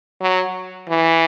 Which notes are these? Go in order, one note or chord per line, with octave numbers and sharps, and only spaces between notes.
F#3
E3